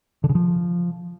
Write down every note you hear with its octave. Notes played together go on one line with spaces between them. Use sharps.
D3
C#3
F3